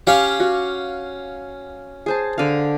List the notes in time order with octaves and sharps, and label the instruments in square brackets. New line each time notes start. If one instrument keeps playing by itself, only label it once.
[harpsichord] C#4 F5 [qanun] G4
[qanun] F#4
G#4 C5 A5
D3 F5